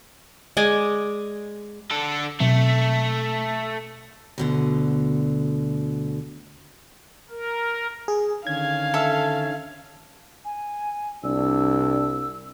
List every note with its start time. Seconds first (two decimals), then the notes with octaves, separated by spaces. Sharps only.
0.57 G#3 D5 D#5 G#5
1.91 D3 A4
2.40 B2 F#3 A3 C4
4.38 D2 B2 D3
7.30 A#4
8.08 G#4
8.47 D3 D#3 C#4 F5 G#6
8.94 A4 E5
10.45 G#5
11.24 C2 D4 E6